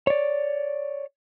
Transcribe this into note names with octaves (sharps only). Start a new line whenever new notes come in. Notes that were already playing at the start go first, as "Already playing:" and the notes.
C#5 D5